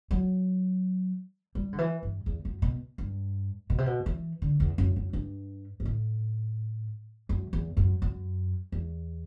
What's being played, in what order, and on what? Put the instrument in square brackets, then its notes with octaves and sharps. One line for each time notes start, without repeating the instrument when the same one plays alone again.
[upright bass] F#3
G3
D3
E3
G2
E2
F#2
B2
G2
B2
C3
B2
E3
D3
E2
F#2
F#2
G2
G2
A2
F#2
E2
F#2
F#2
E2